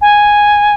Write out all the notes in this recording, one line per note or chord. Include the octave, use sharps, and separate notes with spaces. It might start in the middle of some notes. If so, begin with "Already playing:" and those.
G#5